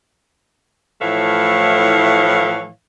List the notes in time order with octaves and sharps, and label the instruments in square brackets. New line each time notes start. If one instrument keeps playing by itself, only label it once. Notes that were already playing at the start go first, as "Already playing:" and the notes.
[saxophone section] A2 E3 F3 A3 C#5 F5